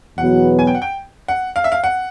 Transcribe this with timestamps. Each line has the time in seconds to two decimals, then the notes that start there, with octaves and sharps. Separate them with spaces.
0.18 E2 B2 F#3 B3 F#5
0.59 G#5
0.67 G5
0.75 F#5
0.82 G5
1.28 F#5
1.56 F5
1.64 E5
1.72 F5
1.84 F#5